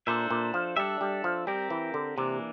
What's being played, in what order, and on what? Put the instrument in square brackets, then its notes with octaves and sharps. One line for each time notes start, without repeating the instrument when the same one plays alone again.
[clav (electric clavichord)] A#2 [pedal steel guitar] D4 A4 C5 E5
[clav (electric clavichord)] A#2
F3
[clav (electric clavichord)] G3 [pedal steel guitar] D4 A4 E5
[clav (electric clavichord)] G3
F3
[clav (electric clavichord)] G3 [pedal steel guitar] C4 G4 A#4
[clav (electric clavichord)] E3
D3
[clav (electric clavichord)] C3 [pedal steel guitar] E3 A#3 D4